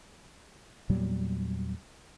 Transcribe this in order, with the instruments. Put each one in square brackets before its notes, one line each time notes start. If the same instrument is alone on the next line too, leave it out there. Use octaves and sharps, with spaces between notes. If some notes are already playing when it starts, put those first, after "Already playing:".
[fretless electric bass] E2 A#2 F#3 G3